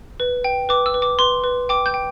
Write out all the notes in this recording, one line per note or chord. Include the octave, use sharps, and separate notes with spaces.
B4
G5
B4 D6
E6
B4
D6
B4 C6
B4
G5 D6
G6
G5